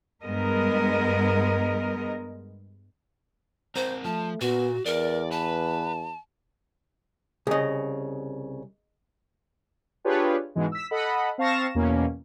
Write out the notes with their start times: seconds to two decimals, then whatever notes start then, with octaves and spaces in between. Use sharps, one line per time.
0.24 G2 G#3 B3 A#4 D#5
3.76 C4 A#4 C5
4.05 F3 A3 A5
4.41 A#2 B3 F#4
4.86 E2 A#4 D5
5.31 B4 A5
7.47 C2 C#3 G#4 D#5
10.04 D4 F4 G4 G#4 B4 C#5
10.55 G#2 B2 E3 G#3
10.72 E6 B6
10.91 A4 D#5 F#5 B5
11.38 C4 F5 A5 C#6 A#6 E7
11.75 E2 B2 A#3 C#4